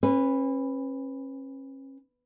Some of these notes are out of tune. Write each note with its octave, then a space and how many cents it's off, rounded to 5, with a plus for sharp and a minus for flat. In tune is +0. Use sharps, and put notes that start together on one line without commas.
C#4 -40 B4 +0